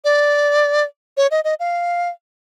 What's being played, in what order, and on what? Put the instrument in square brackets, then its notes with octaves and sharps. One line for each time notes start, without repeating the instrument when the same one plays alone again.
[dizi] D5
C#5
D#5
D#5
F5